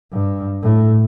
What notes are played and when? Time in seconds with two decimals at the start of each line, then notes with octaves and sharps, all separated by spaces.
0.12 G2
0.63 A2